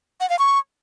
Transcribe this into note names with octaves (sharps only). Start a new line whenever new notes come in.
F#5
F5
C#6